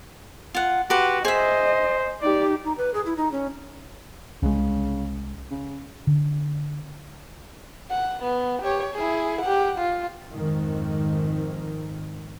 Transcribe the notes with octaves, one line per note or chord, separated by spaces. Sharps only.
F4 F#5
F#4 G4 B4 C6
G#4 C5 D#5 E5
D#4 G4 D5
D#4
B4
G#4
E4
D#4
C#4
C2 C#3 G#3
C#3
D3
F#5
B3
G4 C#5
E4 G#4
G4 F#5
F4
F2 G#2 D#3